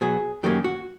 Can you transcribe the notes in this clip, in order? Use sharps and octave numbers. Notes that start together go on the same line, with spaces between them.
B2 F#3 B3 G#4
F#2 D#3 F#3 A#3 C#4 G4
F#4